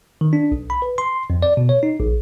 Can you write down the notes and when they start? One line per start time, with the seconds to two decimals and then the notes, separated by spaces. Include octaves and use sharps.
0.21 D#3
0.33 D4
0.52 B1
0.70 B5
0.82 B4
0.98 C6
1.30 F2
1.43 D5
1.57 B2
1.69 C#5
1.83 D#4
2.00 A#1